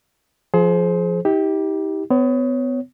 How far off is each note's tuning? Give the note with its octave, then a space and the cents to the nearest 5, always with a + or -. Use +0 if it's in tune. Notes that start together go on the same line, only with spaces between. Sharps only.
F3 +0 G#4 +35 C5 +0
D#4 +45 G4 +0
B3 +35 C#5 +0